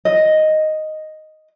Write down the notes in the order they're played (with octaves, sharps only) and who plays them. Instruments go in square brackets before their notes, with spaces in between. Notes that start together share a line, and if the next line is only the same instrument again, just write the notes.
[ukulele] D#5